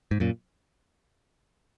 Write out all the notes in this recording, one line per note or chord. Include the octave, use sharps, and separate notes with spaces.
G#2
F#2 A#2